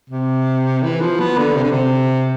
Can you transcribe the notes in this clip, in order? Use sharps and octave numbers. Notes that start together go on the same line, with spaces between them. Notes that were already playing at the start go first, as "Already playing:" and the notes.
C3
E3
F3
B3
D3
C3
D3
C3